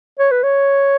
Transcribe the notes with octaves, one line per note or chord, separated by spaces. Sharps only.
C#5
B4
C#5